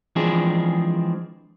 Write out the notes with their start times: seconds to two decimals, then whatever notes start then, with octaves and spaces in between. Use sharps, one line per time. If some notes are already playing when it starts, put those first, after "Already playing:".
0.16 E3 F3 G#3 C4 D4 G#4